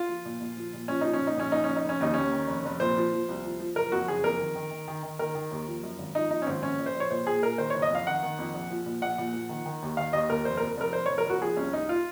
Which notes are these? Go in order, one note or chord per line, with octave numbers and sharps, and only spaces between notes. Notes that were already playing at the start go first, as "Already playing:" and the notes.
Already playing: F4
F3
A#2
A#2
F3
A#2
F3 C#4
F3 D#4
C#4
A#2
D#4
A#1 C#4
A#1 D#4
C#4
A#1
D#4
F1 C#4
D#2 D#4
D#2 C#4
D#3
F1
F1
A#2 C5
F3
F3
C2
F3
F3
F#1 A#4
F2 F#4
F#1 G#4
F2 A#4
D#3
D#3
D#3
D#3
D#3
D#3 A#4
D#3
D#2
F3
F#2
G#1
F3 D#4
F3 D#4
C#4
G#1 C4
A#1 C#4
A#1
C5
A#1
C#5
A#2 C5
A#2 G#4
A#2 A#4
D#3 C5
F#1 C#5
D#5
F2 F5
D#3 F#5
D#3
F2
A#1
F3
A#2
A#1 F#5
A#2
F3
D#3
D#3
D#2
D#3 F5
D#2 D#5
D#2 A#4
F1 C5
F2 A#4
F1 A#4
F1 C5
F1 C#5
A#4
F1 F#4
F3 G#4
C2 C#4
C2 D#4
F4